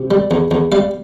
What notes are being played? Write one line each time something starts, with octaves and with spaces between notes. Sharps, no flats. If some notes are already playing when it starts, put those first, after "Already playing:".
Already playing: C3
G3
E2
E2
G3 F5